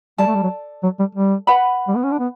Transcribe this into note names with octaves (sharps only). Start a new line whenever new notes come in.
G3 A4 D5 A5
A3
G3
F#3
F#3
G3
G3
B4 F#5 B5
G3
B3
C#4
D4
B3